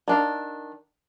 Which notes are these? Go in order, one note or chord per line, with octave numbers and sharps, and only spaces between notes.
D#3 D4 F5